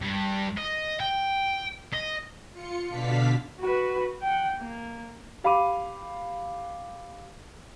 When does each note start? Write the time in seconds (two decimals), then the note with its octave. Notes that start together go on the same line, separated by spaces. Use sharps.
0.01 G2
0.57 D#5
1.00 G5
1.94 D#5
2.52 F4 C#7
2.88 B2 D3 D4 F5 B6
3.60 F#4 B4
4.22 F#5 G5
4.56 A#3
5.44 G4 F5 B5 D6 D#7